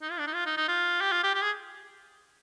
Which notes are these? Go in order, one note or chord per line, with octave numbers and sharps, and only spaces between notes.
D#4
F4
D4
D#4
F4
D#4
D#4
F4
G4
F4
G4
G4
G#4